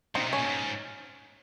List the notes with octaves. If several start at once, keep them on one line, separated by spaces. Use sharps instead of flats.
C#3 C4 D#4
A#2
C3
C#4
A#2
G2
G#2